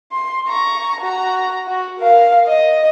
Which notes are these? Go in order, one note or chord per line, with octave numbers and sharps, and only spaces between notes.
C6
A#5 C#6
F#4 A#5
F#4
A#4 F5
D#5